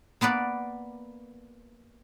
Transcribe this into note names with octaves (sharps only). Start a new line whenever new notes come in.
A#3 B3 B4 D5